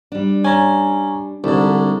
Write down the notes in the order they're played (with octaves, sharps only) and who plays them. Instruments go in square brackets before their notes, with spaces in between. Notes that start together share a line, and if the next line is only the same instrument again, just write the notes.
[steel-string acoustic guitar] G3 D4
[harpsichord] C#4 [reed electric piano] G#5 A#5
[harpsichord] C2 G#2 [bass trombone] D3 [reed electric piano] G3 [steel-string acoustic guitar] A5